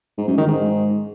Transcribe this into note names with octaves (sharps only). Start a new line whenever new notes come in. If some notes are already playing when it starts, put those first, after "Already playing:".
G#2
F#2
D#3
G#2